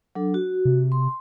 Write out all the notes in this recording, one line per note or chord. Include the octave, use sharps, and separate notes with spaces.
F#3 D4 A4
F#4
C3
C6